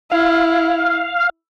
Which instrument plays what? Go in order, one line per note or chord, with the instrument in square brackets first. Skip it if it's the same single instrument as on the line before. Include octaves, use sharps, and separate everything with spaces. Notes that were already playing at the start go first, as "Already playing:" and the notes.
[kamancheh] E4 [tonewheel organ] F5